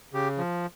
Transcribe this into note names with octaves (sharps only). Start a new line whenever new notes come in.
C#3 G4
F3